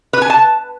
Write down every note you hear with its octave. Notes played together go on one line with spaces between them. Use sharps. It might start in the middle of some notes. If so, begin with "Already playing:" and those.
B4
G#5
A5